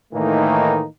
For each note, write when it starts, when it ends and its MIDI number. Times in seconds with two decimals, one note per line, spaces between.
0.13 0.84 45
0.13 0.84 51
0.13 0.84 52
0.13 0.84 57
0.13 0.84 58
0.13 0.84 63